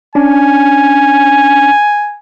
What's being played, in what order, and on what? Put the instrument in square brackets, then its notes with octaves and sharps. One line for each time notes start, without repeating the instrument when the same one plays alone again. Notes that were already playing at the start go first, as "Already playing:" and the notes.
[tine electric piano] C#4 D4 [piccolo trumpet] G#5